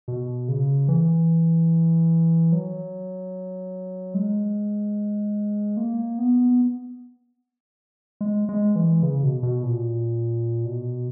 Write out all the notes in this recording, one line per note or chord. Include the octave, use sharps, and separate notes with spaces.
B2
C#3
E3
F#3
G#3
A#3
B3
G#3
G#3
E3
C#3
B2
B2
A#2
B2